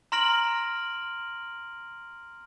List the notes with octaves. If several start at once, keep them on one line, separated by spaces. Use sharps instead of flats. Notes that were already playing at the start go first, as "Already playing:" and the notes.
A#5 C6 F6 A#6 D7 F#7